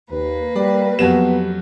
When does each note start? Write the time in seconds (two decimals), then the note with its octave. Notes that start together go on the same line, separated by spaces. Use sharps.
0.11 D#2 A#3 B4
0.56 G3 D5
0.99 F2 F#3 B3 G4 E7